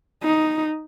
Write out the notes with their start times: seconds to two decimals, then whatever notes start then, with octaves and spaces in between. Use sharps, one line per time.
0.22 D#4